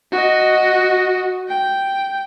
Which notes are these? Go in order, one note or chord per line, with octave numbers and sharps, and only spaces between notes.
F#4 D#5
G5